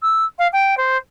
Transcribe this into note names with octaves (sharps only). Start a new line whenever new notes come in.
E6
F5
G5
C5